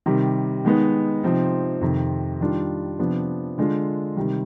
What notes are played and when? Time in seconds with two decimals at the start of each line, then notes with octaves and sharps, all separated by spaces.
0.06 C3 D#3 G3
0.65 D#3 G#3 B3 D#4
1.23 C3 F3 C4 D#4
1.81 F2 C3 D#3
2.40 D#3 G3 D4 F4
2.99 C3 F3 B3 D4
3.58 D3 G#3 D4 F4
4.16 C3 D#3 G3